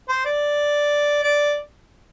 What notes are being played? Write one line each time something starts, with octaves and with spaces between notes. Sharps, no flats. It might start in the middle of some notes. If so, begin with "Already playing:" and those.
C5
D5
D5